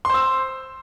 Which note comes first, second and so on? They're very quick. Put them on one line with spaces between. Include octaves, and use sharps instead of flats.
C6 C5 E6